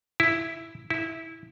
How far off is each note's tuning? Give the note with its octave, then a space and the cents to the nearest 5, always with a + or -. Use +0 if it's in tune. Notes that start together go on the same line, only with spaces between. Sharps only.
E4 +0
E4 -15